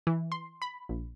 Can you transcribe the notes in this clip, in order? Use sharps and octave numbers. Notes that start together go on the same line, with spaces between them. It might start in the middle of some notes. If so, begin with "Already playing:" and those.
E3
C6
B5
A#1